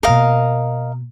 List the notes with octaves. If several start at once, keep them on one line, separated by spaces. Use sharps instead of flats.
B2 A#3 A#4 D#5 F5